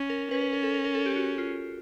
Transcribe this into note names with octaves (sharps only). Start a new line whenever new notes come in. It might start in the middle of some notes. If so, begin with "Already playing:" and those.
Already playing: C#4
A#4
C#4 B4
B4
A#4
A4
A#4
A#4
A4
G4
F#4
F4